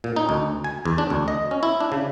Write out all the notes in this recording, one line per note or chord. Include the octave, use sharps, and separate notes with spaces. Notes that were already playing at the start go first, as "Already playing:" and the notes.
A#2
D#4
D2
G#5
E2
D4
D2
D#5
C#4
E4
D4
C#3